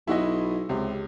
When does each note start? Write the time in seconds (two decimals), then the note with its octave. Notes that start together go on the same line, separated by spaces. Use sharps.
0.07 B1 E4 F#4 D#5
0.69 C#2 C3